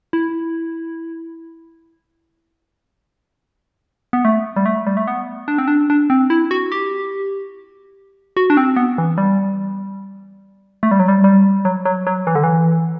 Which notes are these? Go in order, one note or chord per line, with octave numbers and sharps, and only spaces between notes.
E4
B3
A3
G3
A3
G3
A3
B3
D4
C4
D4
D4
C4
E4
F#4
G4
F#4
D4
C4
B3
E3
G3
A3
G3
F#3
G3
G3
F#3
F#3
F#3
E3
D3
E3